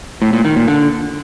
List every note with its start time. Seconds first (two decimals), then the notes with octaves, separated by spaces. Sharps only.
0.22 A2
0.33 A#2
0.45 D#3
0.56 A#2
0.68 D3